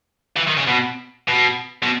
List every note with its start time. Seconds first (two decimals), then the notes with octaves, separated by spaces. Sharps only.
0.37 E3
0.47 D#3
0.57 C#3
0.67 B2
1.28 B2
1.83 B2